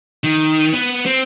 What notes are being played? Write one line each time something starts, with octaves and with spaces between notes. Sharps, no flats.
D#3
B3
C4